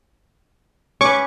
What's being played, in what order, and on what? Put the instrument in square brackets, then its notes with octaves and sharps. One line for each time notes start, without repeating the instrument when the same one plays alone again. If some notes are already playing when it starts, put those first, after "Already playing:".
[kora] C#4 B4 [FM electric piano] C#5 [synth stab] C#6 D6